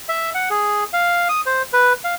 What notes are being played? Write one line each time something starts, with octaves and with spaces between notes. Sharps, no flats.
E5
F#5
G#4
F5
D#6
C5
B4
F5